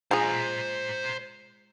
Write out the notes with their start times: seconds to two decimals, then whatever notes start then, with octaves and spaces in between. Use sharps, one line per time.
0.11 G#3 F4 G#4 C5 A#5